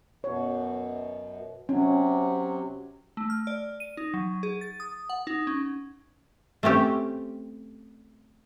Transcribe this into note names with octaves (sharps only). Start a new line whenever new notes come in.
F#2 B2 C#5
C3 F#3 C#4
A3
F6
D5
D#7
D#4
F#3
G#4
A6
D#6
F#5
D#4
C#4
A3 C4 C#4 G4